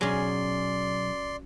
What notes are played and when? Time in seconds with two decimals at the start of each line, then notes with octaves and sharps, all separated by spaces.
0.01 B1 F#3 C#4 G#4 D5 C6